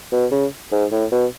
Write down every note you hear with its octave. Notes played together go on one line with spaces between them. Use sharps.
B2
C#3
G#2
A2
B2